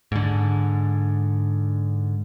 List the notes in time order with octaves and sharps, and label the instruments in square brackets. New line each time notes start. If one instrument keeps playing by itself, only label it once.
[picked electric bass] G#2 D3